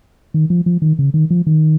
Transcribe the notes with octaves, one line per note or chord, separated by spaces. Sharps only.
D#3
F3
F3
D#3
C#3
D#3
F3
D#3